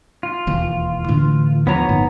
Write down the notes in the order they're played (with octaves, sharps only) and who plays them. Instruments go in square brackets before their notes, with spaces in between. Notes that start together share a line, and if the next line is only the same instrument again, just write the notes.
[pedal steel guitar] F4
[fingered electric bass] E1 D#2 E3
A2 D3 E3
[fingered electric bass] D#2 F3 [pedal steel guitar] B3 C#5 A#5
[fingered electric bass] G1 A2 D#3